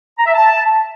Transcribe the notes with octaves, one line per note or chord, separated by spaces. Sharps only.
A#5
E5
A5